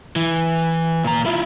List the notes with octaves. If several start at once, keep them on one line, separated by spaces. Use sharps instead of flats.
E3
A#2 A#5
E4 F4